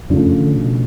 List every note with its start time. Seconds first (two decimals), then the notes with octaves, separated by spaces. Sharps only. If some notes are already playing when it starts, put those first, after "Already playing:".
0.10 F2 C#3 F3 A3 D4
0.25 F#2
0.40 D3
0.55 B2